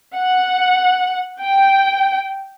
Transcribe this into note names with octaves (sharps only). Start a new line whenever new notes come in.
F#5
G5